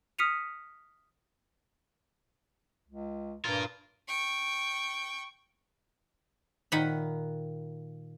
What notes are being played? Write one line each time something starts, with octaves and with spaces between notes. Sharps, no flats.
D#6 F6 B6 C#7 D#7 F7
C#2
G2 F4 A#4
G5 C#6
A#2 D#3 D#5 F#5 B5